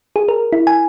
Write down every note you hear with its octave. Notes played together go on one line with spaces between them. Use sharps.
G#4
A#4
E4
G#5